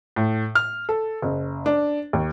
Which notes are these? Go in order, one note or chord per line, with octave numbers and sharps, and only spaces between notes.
A2
F6
A4
F#1
D4
D#2